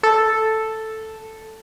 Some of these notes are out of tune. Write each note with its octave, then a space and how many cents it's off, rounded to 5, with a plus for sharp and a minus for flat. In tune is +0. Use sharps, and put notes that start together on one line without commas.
A4 +0